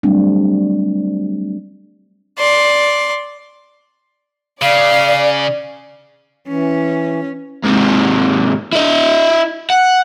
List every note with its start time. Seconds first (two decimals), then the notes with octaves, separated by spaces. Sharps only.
0.03 F#3 G3 A3 C4 D4
2.39 D5 C6
4.62 C#3 D5 F5
6.47 E3 C#4
7.64 G#2 C3
8.73 E4 D#5
9.70 F#5